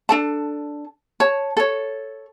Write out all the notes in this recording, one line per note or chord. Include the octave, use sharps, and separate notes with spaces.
D4 A4 A5
C#5 A5
A4 C#5